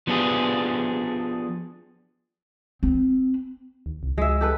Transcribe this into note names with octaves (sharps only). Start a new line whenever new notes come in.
F3 B3 D4 G4 G#4
C4
D#2
C2
C#2 G#3 E5
G4 A4 B4